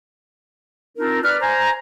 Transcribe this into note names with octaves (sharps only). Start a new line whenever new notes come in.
C4 D4 D#4 F4 A#4
B4 D5 F6
C5 G#5 A#5